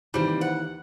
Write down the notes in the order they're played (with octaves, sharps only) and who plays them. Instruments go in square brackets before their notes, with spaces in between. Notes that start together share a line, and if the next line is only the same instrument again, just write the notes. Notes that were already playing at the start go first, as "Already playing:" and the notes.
[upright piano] D#2 E3 [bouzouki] G3 C4
[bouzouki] F#5